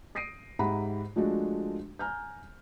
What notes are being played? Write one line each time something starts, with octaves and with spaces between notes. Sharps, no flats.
D#6 A#6 C7 D7 D#7
G#2 G4 E5 F#5 A#5 B5
F3 G#3 A3 D4 F#4
G#5 A#5 F6 G6